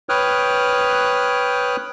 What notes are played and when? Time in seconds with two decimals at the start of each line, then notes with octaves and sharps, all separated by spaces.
0.09 B4 C#5 G5 D#6 F6 F#6